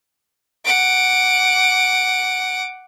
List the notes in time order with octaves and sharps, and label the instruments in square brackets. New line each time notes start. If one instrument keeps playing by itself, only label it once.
[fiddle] F#5 D6